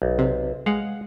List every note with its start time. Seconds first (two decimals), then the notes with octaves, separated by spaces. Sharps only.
0.02 B1
0.19 C3
0.66 G#3 F5 F#5